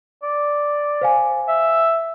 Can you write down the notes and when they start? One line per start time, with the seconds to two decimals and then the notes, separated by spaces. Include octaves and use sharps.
0.23 D5
1.01 C5 F5 G#5
1.48 E5